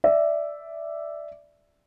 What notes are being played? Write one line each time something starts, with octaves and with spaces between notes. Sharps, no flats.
D5 E5